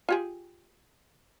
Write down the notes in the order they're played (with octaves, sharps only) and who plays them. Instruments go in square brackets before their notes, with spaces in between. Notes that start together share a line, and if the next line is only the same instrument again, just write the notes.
[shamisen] F4 G4 G#4